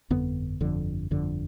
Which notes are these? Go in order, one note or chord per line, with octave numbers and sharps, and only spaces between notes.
G1 F2 D3 B3
G1 F2 D3
G1 F2 D3